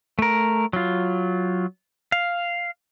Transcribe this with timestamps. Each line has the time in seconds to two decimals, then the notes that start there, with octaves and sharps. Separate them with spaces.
0.19 A3 A#4
0.73 F#3 F4
2.12 F5